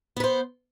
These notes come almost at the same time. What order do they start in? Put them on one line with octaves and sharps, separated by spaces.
B3 B4 C5